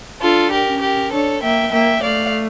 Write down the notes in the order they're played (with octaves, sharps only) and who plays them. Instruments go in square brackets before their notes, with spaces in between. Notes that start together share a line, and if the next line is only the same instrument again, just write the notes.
[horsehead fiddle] D4 [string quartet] F4 A4
[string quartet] G4 A#4
[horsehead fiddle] C#4
[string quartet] G4 A#4
[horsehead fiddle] D4 [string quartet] A4 C#5
[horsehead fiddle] A#3 [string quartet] E5 G5
[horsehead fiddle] A#3 [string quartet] E5 G5
[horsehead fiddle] A3 [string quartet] D5 F5